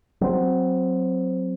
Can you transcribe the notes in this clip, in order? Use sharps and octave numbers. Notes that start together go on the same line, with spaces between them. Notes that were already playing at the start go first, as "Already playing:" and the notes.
F#3 C4